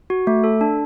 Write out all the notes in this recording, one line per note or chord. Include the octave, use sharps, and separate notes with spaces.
F#4
A3
A4
D4